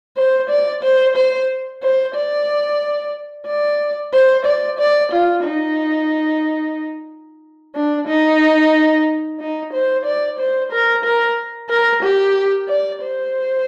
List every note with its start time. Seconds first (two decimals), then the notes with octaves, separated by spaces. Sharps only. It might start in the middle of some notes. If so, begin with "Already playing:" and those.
0.17 C5
0.50 D5
0.83 C5
1.17 C5
1.82 C5
2.15 D5
3.47 D5
4.13 C5
4.46 D5
4.78 D5
5.12 F4
5.44 D#4
7.75 D4
8.08 D#4
9.40 D#4
9.73 C5
10.05 D5
10.39 C5
10.72 A#4
11.04 A#4
11.70 A#4
12.03 G4
12.68 D5
13.02 C5